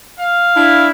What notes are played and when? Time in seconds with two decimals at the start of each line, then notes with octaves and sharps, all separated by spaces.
0.19 F5
0.56 D4 E4